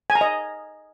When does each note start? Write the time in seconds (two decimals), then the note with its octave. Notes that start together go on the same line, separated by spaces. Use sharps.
0.10 G#5
0.15 A#5
0.21 D#5